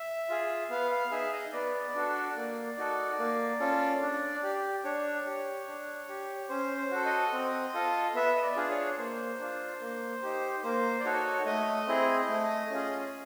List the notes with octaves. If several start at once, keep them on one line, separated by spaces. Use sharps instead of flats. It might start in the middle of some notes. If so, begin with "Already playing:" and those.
Already playing: E5
F4 G#4
B3 F5
F5
D#4 G#4 E5
D#5
B3 D5
D4 F#4 A4
A#3
D#4 F#4 A4
A#3
C#4 F4 A4
D4
G4
D4 C#5
G4
D4
G4
C#4 C5
C5
F#4 A4
D#5
C4
F4 A4
B3 E5
D#5
D5
D4 F4 G#4
C#5
A#3 C5
D4 F4
A#3
D#4 G4
A#3 C5
D5
D#4 F#4 A4 C#5
A3 D#5
C4 E4 G#4
A3
C#4 F4 G#4